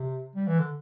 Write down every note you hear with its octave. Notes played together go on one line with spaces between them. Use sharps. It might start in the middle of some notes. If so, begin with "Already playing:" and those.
Already playing: C3
G3
E3
D3